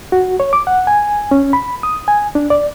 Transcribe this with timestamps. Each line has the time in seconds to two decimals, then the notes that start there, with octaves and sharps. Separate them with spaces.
0.12 F#4
0.40 C#5
0.53 D6
0.67 F#5
0.87 G#5
1.31 C#4
1.53 B5
1.83 D#6
2.08 G#5
2.35 D4
2.50 D5